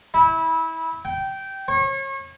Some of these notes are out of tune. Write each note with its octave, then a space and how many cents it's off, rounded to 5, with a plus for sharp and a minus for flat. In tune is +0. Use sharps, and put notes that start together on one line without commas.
E4 -25
G5 -15
C#5 -35